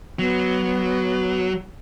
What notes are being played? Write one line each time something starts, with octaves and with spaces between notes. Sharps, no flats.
F#3 B3